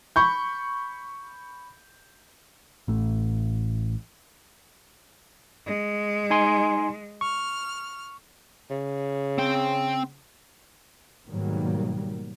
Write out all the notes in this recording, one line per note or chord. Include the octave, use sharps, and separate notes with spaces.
B5 C#6 G6
A1 A3
G#3
D#4 G#5 C6
C#6 F6
C#3
C4 G5
G#2 B2 D#3 F#3 G3 A#3